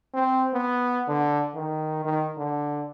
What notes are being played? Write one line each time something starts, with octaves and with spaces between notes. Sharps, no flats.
C4
B3
D3
D#3
D#3
D3